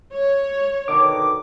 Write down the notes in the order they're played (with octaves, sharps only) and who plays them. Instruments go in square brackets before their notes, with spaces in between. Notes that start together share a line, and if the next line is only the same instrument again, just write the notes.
[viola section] C#5
[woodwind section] B2 D3 D#3 [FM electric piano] D6